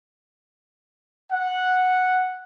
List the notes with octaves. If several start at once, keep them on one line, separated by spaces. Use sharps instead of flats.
F#5